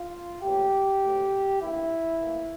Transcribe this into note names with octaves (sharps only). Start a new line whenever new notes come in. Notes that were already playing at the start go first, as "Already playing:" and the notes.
Already playing: F4
A#1 A2 E3 G4
D2 D3 A3 C4
A1 G2 E3 A#3 E4
A2 E3 A#3